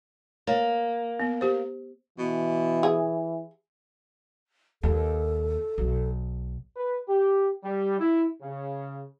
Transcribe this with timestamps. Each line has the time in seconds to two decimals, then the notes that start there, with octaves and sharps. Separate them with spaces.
0.47 A#3 C#5
1.20 B3
1.41 G4 C5
2.18 B2 E3
2.83 G#4
4.83 D#2 A4
5.78 B1
6.77 B4
7.09 G4
7.63 G3
7.99 E4
8.42 C#3